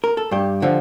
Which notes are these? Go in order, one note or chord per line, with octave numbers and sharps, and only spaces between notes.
A#4
A4
G2 G4
D3 F3